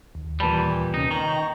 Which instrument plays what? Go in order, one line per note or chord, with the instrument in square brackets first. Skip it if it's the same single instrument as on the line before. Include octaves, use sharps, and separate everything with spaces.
[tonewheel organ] D#2
[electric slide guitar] A#2 G3 [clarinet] E3 [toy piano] A5 B5
[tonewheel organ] C3 C#4 [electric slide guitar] D#4
[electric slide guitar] D#3 [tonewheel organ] G5 C#6 [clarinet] A#5